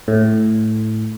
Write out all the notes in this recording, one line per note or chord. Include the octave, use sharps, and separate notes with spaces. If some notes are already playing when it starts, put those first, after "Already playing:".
A2